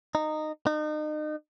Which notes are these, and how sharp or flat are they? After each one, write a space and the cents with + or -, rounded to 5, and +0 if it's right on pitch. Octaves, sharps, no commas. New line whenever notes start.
D#4 -15
D#4 -35